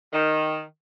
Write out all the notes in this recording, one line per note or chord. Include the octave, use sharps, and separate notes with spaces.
D#3